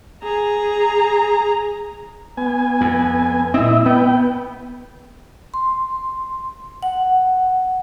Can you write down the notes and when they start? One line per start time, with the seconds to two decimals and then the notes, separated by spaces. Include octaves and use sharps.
0.23 G#4 A#5
2.37 B3 G#5
2.81 F2
3.54 A#2 C4 E4 D#5 E5
3.86 B3 B4 G5
5.54 C6
6.82 F#5